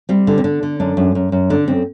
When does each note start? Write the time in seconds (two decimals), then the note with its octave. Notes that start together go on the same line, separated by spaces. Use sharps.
0.09 G3 C4
0.27 D3
0.38 C4
0.44 D3 D4
0.63 D3
0.80 F#2 D4
0.97 F#2
1.15 F#2
1.32 F#2
1.50 D3 D4
1.68 F#2 C4